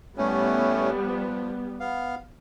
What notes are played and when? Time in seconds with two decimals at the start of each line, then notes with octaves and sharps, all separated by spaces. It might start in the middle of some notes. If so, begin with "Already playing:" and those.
0.18 A2 G3 A3 B3 C#4
1.04 F3
1.80 B3 F5